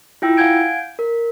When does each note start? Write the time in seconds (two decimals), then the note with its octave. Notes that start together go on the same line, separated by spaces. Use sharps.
0.22 E4 F4 G5 E6
0.37 F5 F#5 G#5 G6 G#6 D7
0.99 A#4